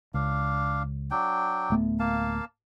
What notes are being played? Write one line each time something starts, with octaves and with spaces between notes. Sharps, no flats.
C#2 D4 F5
F#3 D4 G5
D1 A3 B3
A#3 F5 A5